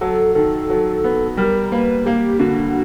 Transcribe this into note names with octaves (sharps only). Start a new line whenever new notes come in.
F#3 A4
D#3 A4
F#3
B3
G3 A#4
A#3 B4
A#3 G4
D3 F#4